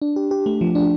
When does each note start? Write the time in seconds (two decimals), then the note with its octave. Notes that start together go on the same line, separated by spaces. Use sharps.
0.02 D4
0.16 G4
0.31 G4
0.46 A3
0.61 F3
0.75 D4